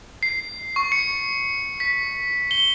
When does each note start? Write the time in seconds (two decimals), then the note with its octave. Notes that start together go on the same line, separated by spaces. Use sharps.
0.23 C7
0.76 C#6
0.92 C#7
1.80 B6
2.51 G7